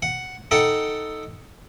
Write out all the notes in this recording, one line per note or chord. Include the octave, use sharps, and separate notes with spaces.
F#5
D#4 A4 F#5 G5